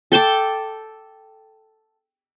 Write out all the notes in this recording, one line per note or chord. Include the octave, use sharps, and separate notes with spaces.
A4 G5 A5 D6